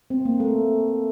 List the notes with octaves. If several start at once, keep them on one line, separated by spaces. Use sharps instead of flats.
C4
A#3
A3